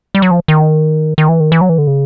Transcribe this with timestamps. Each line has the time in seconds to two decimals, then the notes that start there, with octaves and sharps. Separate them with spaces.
0.15 G3
0.22 F#3
0.31 F3
0.48 D#3
1.18 D#3
1.29 E3
1.40 D#3
1.52 E3
1.61 F#3
1.69 E3
1.78 D3
1.87 C#3